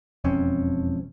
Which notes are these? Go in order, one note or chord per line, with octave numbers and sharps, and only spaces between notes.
E1 F2 C4 C#4